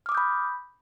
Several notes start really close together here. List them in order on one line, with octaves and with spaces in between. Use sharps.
F6 D6 D#6 G6 B5